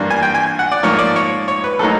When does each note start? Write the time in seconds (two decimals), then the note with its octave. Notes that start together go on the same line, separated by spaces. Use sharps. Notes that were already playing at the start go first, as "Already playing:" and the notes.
Already playing: G2 E3 G3 A#3 D4
0.10 G#5
0.23 G5
0.35 G#5
0.59 F#5
0.72 D5
0.83 G#2 F3 A#3 C#5
0.99 D5
1.16 C#5
1.48 C#5
1.64 B4
1.79 A2 F#3 A#3 D#4 A4